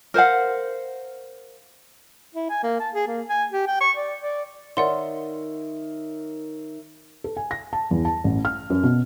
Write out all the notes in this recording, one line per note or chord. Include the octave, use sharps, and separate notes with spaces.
A#4 C5 F5 F#5
E4
G#5
A#3
A5
G#4
A#3
G#5
G4
G5
C#6
D5
D5
D#3 A#4 C#5 D5 E5 F#5 C6
A4
G#5
A#6
A5
E2
A5
A1
F6
F#2
B2